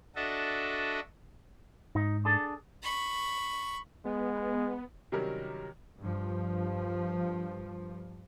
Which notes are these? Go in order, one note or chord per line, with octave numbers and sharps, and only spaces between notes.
D4 F#4 A4 D#5 E5
G#2 D#4
D4 G#4 A4
B5 C#6
G#3 B3
C3 D#3 F#3 G3 C#4 A#4
G2 F3